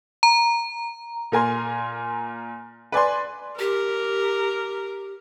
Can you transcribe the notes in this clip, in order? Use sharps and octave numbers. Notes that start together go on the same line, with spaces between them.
A#5
A#2 A#4 G#5 C6
B4 D5 G#5 C6
G4 A#4